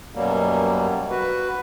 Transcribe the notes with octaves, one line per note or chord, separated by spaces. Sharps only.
F#2 B2 F#3 G3 A#3
F#4 B4